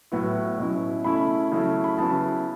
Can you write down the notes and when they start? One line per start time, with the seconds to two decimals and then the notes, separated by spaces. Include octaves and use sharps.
0.12 A2 F#3 B3 E4
0.58 B2 F#3 C#4 E4
1.04 C#3 A3 C#4 E4 B5
1.52 C#3 F#3 A3 C#4 E4
1.84 B5
1.98 C#3 F#3 B3 E4 A5